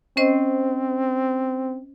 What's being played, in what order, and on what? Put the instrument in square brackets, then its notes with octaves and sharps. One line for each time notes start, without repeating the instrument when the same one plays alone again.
[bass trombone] C4 [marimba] C#4 C5 D#5